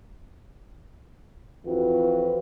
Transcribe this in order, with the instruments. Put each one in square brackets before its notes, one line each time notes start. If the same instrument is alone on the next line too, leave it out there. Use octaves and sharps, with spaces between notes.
[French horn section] F2 E3 C4 F4 F#4 B4